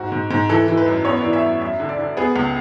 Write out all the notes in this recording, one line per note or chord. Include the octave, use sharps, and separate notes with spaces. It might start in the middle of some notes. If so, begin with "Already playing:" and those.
Already playing: G#2 F#4
G#2
G#2
E3 A4
E3
B4
F#2
B3 C#5
E3 D5
E5
F#2
F#2 E5
D3
D5
D3
B3 G#4
C#2